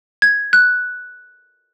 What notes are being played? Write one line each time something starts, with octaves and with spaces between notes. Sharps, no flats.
G#6
F#6